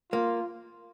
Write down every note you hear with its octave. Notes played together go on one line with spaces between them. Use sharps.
A#3 F4